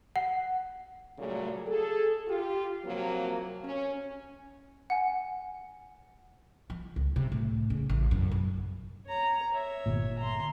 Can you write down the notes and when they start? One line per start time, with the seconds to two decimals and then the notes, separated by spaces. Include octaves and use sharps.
0.16 F#5
1.19 A#2 C#3 F#3 G3 A3
1.68 G#4 A4
2.28 F4 G4
2.86 C3 F3 F#3 A#3
3.64 C#4
4.90 F#5 G#5
6.70 F3
6.96 C#2
7.16 C3
7.32 A2
7.70 C#3
7.90 A1
8.11 F#2
8.32 B1
9.06 C#5 A#5
9.53 C#5 E5
9.86 G1 A#2
10.19 A#5 C6